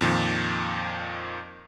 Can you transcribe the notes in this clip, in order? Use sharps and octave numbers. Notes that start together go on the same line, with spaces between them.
F2 A#2 D#3 F3